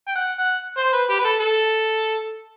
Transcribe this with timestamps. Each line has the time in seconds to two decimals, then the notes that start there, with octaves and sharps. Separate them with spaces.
0.08 G5
0.15 F#5
0.40 F#5
0.78 C5
0.93 B4
1.10 G4
1.19 B4
1.25 A4
1.40 A4